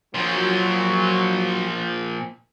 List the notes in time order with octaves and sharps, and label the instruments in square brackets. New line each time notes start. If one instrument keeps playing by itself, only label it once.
[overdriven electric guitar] A#2 F3 [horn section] F#3